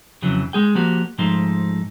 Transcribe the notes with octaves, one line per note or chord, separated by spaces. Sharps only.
F2 C#3 E3 F#3
G#3 G#4 G5
F3 A#3 F#4 G4
G#2 F3 A3 D#4 C6